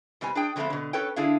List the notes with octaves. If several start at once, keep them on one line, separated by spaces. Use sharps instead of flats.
B2 G3 C4 B4 G#5
D4 G#4 G5
D3 F3 G#3 A3 B3 C4
B2 D3
C#4 A4 B4 C#5 G5
D3 D4 E4 G#4 F5